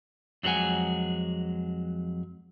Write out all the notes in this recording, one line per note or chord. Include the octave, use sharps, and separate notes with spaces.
F2 F#3 G#3 B3 F#5 G#5